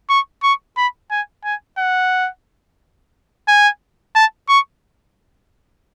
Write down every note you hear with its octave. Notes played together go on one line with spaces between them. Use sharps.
C#6
C#6
B5
G#5
G#5
F#5
G#5
A5
C#6